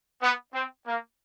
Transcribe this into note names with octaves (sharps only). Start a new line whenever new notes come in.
B3
C4
A#3